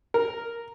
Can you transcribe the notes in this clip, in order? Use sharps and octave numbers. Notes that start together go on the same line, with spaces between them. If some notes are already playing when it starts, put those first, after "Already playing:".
A#4